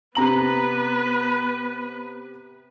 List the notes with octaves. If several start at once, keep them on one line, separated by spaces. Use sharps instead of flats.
C3 B3 B4 A#5 F#7